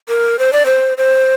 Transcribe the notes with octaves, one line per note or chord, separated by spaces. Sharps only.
A#4
C5
D5
C5
C5